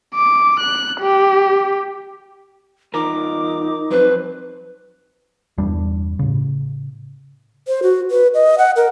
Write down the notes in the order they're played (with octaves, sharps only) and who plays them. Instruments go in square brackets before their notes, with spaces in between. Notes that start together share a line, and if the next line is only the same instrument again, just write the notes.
[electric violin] D6
F#6
G4
[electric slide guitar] E2 F4 A#4 [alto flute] D#4 [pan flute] D6
[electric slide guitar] F2 F#3 C4 [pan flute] B4
[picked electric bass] G1 E2 G3 D4
A2 C#3
[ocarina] C5
F#4
B4
D#5
F#5
A#4